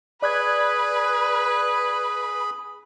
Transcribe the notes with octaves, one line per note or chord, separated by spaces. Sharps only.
G#4 B4 D5 B5 F#6 G#6